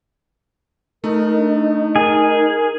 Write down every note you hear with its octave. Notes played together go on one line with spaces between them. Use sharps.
A3 D#4 A#4
D4
G#4 A#4